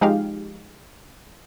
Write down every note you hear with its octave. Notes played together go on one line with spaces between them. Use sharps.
F3 G#3 D#4 G4 F5